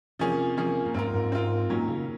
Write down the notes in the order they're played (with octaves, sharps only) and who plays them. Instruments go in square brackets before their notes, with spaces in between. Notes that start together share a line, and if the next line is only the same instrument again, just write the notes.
[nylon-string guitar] C3 [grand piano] F3 A#3 C#4 G#4
[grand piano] F3 A#3 C#4 G#4
[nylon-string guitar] A#2
[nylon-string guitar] G#2 [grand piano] C4 F4 A#4
[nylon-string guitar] G#2
[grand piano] C4 F4 A#4
[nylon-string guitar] A#2 [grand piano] D#3 F#3 C#4
[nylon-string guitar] C#3